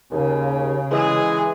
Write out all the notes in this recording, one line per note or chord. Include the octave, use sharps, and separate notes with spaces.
D#2 C#3
E3 G#3 G#4